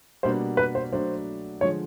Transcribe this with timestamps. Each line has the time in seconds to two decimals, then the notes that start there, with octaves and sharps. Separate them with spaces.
0.23 B2 G3 A#3 D4 F#4 C5
0.57 B4
0.75 C5
0.92 F#3 A3 D4 F#4 C5
1.61 D3 F3 G#3 C#5